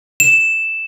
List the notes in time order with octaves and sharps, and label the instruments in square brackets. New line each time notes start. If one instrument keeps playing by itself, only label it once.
[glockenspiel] E7